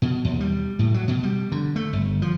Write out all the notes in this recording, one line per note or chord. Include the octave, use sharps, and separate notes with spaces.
B2
D#2
G3
A2
F#3
B2
G3
D3
A3
G1
F3